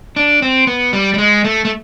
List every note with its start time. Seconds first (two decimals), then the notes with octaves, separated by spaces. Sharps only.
0.16 D4
0.42 C4
0.67 B3
0.93 G3
1.14 G3
1.18 G#3
1.44 A3
1.65 A3